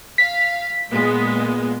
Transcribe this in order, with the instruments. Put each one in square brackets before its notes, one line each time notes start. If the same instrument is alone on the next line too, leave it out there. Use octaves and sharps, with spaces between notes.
[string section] F5 [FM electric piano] B6
[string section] A#2 G#3 B3